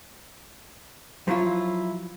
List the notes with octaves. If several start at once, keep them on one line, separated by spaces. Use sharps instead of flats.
F3 F#3 E4 F4